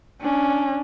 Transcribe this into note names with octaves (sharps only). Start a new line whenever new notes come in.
C#4 D4